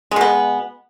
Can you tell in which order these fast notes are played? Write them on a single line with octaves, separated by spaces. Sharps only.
G#3 B2 B3